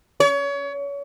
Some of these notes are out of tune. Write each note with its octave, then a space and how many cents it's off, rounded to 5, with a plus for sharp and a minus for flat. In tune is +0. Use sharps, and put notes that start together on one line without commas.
C#5 +30